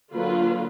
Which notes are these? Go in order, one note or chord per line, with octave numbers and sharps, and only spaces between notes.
D3 F#3 A#3 F4 B4